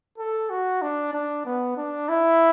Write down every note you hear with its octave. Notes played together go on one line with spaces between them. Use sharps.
A4
F#4
D4
D4
B3
D4
E4